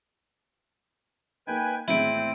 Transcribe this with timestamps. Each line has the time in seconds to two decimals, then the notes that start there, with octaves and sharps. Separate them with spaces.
1.47 A#3 D#4 B4 G5 G#5
1.88 G#1 E2 A2 C4 E4 D7 D#7